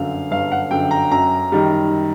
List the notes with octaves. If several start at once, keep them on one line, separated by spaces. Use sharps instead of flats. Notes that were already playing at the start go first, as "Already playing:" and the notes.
Already playing: G1 F#2 D3 F5
G1 F5
F#5
F#2 D3 G5
A#5
F#2 A#5
D#3 G3